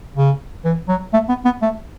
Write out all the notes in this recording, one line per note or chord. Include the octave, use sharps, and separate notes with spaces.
C#3
E3
F#3
A3
B3
B3
A3